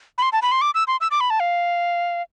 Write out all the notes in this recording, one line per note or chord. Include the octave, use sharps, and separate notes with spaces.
B5
C6
A5
B5
C6
D6
E6
C6
E6
D6
B5
A5
F5